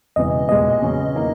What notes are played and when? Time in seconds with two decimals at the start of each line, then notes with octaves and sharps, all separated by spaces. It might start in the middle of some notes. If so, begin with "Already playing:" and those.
0.16 E1 E2 C#3 E3 D#5
0.49 B1 A#2 G#3 D#5
0.82 E2 C#3 F#3 C#4
1.15 D#3 A#3 E4